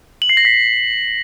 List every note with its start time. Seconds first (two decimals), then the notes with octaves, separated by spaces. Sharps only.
0.22 F#7
0.29 C7
0.37 A#6
0.45 B6